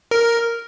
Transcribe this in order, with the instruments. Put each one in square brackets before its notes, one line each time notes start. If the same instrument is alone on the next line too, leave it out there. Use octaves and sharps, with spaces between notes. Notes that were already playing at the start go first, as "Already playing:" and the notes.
[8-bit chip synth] A#4